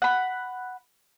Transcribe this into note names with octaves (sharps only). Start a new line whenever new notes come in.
F#5 B5